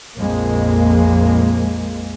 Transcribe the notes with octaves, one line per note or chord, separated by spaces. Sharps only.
A#1 F2 G#3 A#3